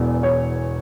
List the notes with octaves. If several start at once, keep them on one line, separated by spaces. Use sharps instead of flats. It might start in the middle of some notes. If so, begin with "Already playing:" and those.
Already playing: E1 E2
C#5